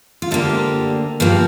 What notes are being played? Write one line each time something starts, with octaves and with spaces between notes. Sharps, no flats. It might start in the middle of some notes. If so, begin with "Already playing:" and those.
F4
D2 D3 A#3 G4
G2 F3 A#3